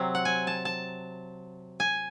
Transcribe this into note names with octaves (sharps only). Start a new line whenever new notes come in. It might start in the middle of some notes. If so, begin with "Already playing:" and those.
Already playing: C3 F#3 C4
F#5
G#5
A5
A5
G#5